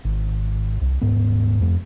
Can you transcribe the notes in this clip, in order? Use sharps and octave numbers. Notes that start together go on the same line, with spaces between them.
G#1
C2
D#1 G#2 B3
F2 A3